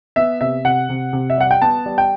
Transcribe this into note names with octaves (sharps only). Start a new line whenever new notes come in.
B3 E5
C3 E5
C3 F#5
C3
C3
E5
G3 F#5
G5
B3 A5
G3
G5